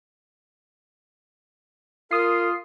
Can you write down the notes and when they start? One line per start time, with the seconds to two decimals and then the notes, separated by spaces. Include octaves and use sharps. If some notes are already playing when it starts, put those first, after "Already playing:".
2.11 F4 A#4 D#6 C7